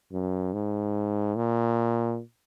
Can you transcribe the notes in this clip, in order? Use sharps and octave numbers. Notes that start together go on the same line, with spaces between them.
F#2
G#2
A#2